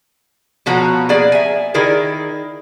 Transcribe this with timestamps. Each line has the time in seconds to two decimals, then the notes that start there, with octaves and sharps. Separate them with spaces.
0.66 B2 F3 F#4 C#5 A#5
1.09 A#3 G#4 D5
1.32 E5 G#5
1.74 D#3 E4 G#4 A#4 D5